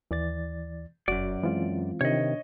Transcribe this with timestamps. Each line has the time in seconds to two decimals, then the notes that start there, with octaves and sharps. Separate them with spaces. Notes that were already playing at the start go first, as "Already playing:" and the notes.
0.11 D#2 E3 D5 A6
1.08 F1 F#2 F#4 D5
1.43 E3 G#3 C4 F4
2.01 C3 D#3 D4 C#5 D#5